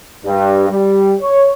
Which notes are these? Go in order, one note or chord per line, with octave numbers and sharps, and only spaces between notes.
G2
G3
C#5